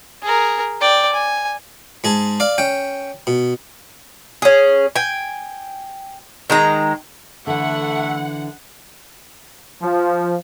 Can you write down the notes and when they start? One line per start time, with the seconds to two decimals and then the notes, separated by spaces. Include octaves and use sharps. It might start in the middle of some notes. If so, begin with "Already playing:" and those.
0.23 G#4 A#4
0.81 D5 G5
1.13 G#5
2.04 G#2 G#4 A5
2.40 D5 F5
2.58 C#4 G5
3.27 B2
4.42 C#4 G#4
4.96 G5 G#5
6.50 D#3 G#3 A#5
7.47 D3 E3 A3 F#5
9.82 F3